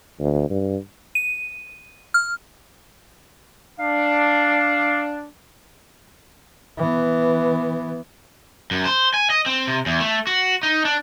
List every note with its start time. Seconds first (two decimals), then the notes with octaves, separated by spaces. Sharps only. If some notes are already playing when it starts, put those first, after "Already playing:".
0.20 D2
0.50 G2
1.15 D#7
2.14 F6
3.79 D4 F5
6.78 E3 B3
8.71 F#2
8.85 C5
9.14 G#5
9.30 D#5
9.46 C4
9.67 C3
9.86 E2
10.00 A3
10.27 F#4
10.63 D#4
10.85 D4